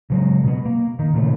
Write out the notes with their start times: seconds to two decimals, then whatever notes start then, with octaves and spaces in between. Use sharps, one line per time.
0.10 C#3 F#3 G#3
0.44 B2 B3
0.65 A#3
0.99 D#3
1.13 A#2 C#3 A3